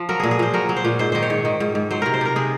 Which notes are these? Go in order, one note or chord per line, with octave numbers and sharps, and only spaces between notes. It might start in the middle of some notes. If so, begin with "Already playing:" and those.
Already playing: F3
F#3 A#4
A#2 G#4
G#4
A#2 C5
F#3 A#4
F#3
C5
A#2
G#2 C5
D#3 C5
C#5
G#2
D#3
G#2
G#2
F#3 C5
C3 A#4
C5
C3 A#4
C3 G#4